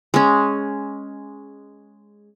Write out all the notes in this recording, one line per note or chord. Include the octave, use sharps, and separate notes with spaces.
G#3 C#4